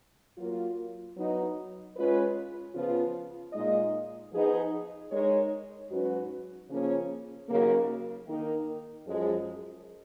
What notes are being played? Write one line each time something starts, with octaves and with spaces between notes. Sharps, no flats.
F#3 A#3 F4
F#3 B3 D#4
G#3 C#4 F4 B4
C#3 F3 B3 F4
A#2 G#3 D#4 G#4 D#5
F3 B3 D#4 G#4 D#5
G#3 D#4 A#4 C#5
G#2 F#3 C#4 F#4 B4
C#3 F3 A#3 C#4 G#4
D#2 C#3 F#3 A#3
D#3 A#3 D#4 A#4
F#2 F3 G#3